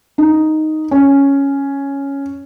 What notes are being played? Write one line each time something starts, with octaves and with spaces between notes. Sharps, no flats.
D#4
C#4